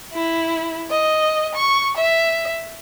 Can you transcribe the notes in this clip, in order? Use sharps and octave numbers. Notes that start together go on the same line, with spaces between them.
E4
D#5
C#6
E5